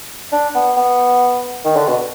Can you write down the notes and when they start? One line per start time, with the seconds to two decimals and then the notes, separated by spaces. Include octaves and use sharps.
0.32 D4
0.55 B3
0.77 B3
1.65 D#3
1.76 D3
1.87 B2